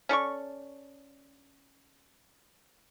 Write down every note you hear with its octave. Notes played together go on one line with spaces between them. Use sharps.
C#4 A4 D5 C#6